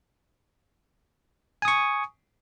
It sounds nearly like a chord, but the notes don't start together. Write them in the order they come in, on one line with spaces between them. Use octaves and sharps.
G#5 D#6 C#6